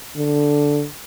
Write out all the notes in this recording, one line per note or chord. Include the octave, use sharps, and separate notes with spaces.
D3